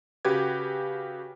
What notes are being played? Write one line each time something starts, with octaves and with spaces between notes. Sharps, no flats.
C#3 F#4 G4 B4 G#6